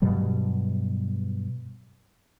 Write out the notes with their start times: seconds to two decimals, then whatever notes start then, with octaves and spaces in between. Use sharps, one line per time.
0.02 G2 B2 F#3 G3